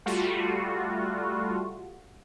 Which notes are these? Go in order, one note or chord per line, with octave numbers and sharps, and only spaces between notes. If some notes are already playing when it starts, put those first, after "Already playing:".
G3 A3 F4 F#4